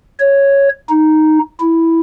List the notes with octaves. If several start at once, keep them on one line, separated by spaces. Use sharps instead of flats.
C#5
D#4
E4